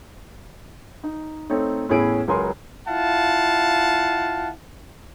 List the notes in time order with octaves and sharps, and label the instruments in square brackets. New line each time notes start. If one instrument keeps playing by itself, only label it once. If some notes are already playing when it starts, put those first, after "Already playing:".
[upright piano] D#4
A3 C4 D#4 C#5
E2 A2 C#4 E4 G#4 D7
C#2 F#3 G#4 A#4 G#5 C6
[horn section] E4 F4 F5 F#5 A5